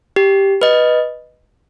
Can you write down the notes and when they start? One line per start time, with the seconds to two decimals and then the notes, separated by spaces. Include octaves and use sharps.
0.16 G4
0.61 B4 D#5